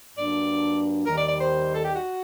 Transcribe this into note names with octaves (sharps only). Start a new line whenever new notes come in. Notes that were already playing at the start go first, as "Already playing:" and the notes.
G2 F#3 A#3 D4 D5
D#2 D#3 G3 A#4
D5
D5
C5
A4
G4
F#4